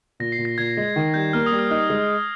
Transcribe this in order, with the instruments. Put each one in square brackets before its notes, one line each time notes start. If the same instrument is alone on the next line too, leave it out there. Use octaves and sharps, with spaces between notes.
[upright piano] A#2 [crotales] A#6
[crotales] C7
[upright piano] A#2
[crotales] A#6
[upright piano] A#2 [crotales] G#6
[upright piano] G#3
D#3
[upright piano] G3 [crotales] G6
[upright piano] A#3 [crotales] F6
[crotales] D#6
[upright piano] G3
[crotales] F6
[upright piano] D#4 [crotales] F6
[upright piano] G#3